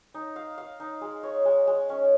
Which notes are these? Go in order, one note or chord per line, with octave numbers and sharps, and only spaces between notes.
D#4
F5
F5
D#4
G#3
C#5
G#3
G#3
C#4